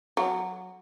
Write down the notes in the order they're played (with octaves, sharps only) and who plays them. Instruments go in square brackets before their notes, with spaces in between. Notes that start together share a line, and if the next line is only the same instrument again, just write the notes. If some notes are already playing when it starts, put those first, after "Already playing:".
[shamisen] F#3